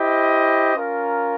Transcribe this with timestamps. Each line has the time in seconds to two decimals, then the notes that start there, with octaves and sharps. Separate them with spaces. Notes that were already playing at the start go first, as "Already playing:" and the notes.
Already playing: E4 G4 C5 D#5
0.74 C#4 F4 A#4